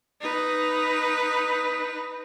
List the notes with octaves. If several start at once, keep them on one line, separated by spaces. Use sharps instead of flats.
D#4 B4